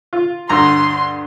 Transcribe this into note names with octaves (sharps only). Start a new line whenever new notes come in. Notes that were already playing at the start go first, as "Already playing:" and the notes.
F4
D2 G2 A#5 C6